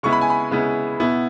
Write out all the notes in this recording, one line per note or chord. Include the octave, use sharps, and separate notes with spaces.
C#3 G#3 B3 E4 C#6
B5
G#5
B5
C#3 G#3 B3 E4
B2 B3 E4